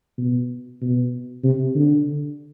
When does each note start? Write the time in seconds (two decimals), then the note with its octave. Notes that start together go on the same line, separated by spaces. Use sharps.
0.18 B2
0.81 B2
1.44 C3
1.75 D3